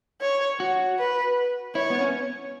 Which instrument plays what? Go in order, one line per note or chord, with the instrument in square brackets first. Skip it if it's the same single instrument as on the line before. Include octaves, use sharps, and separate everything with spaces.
[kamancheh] C#5
[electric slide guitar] F#4
[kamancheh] B4
[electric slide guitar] E4 [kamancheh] C#5
[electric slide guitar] B3
C#4